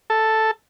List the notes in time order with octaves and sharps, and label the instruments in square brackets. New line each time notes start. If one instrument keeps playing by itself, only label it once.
[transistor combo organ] A4